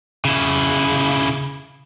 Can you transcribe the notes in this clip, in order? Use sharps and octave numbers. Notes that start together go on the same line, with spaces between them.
C#3 E4